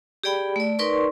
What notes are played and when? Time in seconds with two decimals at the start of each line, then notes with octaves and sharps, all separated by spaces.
0.24 G4 G#4 D5 G5 B5
0.56 A3 D5
0.79 D#4 A#4 B4 D5 C6 C#6